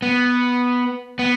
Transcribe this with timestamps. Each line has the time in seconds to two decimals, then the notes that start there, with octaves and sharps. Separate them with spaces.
0.02 B3
1.19 B3